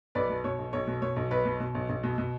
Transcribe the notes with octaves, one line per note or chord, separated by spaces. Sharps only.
B1 B4 D5
B2
B2 C#5
B1
B1 C#5
B2
B2 C#5
B1
B1 B4
B2
B2
B1
B1
B2
B2